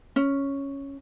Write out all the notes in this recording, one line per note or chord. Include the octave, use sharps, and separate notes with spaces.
C#4